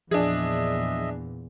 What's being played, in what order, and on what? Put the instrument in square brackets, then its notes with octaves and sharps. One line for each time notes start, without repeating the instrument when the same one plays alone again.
[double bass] E2 A#2 [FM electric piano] F3 [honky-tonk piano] D4 G#4 [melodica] D#5 E5